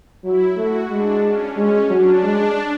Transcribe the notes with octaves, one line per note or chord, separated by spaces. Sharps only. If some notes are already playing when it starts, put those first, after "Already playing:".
F#3 E4
A3 F#4
G#3 D4
C#4
G#3 C#4
F#3 D4
G#3